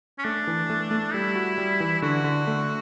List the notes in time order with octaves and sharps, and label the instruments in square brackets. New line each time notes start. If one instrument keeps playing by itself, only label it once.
[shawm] C#4
[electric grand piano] A3 [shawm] D4
[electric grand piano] E3
A3
A3
[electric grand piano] G3 [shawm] E4
[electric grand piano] F#4
G3
E3
[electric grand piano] D3 [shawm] F#4
[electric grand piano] D3
A3